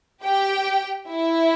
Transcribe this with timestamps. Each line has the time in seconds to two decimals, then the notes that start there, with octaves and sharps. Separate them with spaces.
0.23 G4 G5
1.09 E4 E5